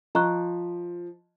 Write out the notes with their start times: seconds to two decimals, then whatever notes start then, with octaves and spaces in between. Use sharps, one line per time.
0.15 F3 D#5 A#5 C#6 F#6